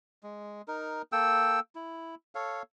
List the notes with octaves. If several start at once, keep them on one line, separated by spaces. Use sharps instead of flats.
G#3
D#4 A#4
A#3 A4 G5 E6
E4
A4 C#5 F5